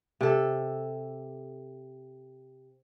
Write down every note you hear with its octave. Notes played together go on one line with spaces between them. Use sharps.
C3 A4